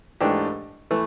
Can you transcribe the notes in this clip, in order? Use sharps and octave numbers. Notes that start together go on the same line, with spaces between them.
G#2 E3 A3 D4 G4
E3 A3